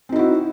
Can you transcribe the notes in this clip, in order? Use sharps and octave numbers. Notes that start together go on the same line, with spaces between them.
C4 D#4 E4 F#4